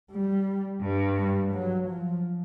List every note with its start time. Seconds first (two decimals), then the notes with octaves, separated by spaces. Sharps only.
0.11 G3
0.82 G2
1.18 G3
1.53 F#3
1.89 F3